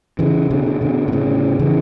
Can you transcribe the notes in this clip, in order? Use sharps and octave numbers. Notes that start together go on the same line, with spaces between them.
C#3 E3
B2 D3
B2 D3
B2
A2 C#3
C#3 E3